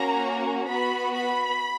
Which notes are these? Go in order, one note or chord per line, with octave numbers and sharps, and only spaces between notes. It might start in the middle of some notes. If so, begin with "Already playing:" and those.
Already playing: A#3 C#4 F#4 A#5
B3 F#4 B5
B5